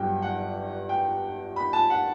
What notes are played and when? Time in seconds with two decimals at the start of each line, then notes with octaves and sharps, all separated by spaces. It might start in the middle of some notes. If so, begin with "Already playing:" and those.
Already playing: G1 G2 F#3 G5
0.22 F#5
0.89 G5
1.56 B5
1.73 A5
1.90 F#5